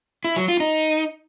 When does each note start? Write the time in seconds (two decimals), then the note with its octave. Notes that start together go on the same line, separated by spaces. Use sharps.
0.24 E4
0.36 F#3
0.48 F4
0.60 D#4